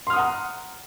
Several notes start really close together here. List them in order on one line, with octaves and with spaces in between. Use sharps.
C6 F6 D#6 F#5 A#5